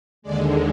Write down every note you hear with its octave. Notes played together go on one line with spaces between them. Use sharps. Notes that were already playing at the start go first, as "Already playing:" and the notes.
D#2 D3 G#3 D5